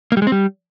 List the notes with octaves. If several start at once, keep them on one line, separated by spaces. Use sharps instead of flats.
A#3
G3
G#3
C4
G3